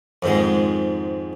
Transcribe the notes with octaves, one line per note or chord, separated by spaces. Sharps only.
F2 G#2 D#3 G#3